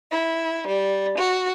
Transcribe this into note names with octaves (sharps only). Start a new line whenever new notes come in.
E4
G3
F#4